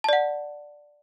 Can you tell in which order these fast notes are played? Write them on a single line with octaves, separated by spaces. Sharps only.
A5 D5 F#5